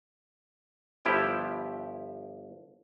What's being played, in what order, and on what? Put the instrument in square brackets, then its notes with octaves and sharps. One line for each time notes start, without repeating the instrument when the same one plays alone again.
[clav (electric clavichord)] G1 F3 E4 G4 G5